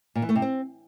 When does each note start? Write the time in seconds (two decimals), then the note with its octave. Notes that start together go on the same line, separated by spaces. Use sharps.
0.15 A#2
0.22 E3
0.29 A3
0.35 C3
0.42 C4